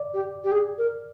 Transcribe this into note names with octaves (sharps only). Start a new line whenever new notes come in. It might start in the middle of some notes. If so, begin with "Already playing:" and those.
Already playing: D5
G4
G4
G#4
A#4